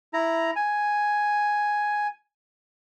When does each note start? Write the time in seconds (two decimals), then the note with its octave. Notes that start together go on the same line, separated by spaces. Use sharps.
0.14 E4 A#5
0.56 G#5